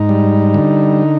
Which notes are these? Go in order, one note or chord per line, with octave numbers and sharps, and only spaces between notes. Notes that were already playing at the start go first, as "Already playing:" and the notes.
Already playing: G#2 D#4
G3
D3